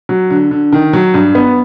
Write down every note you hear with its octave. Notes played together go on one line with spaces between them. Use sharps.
F#3
D3
D3
D#3
F#3
G2
B3